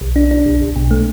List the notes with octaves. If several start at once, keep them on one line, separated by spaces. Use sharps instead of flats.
B1
D4
D4
B1
B1
B2
A3